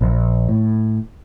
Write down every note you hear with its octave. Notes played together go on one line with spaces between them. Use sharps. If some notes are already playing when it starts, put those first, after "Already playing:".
A#1
A2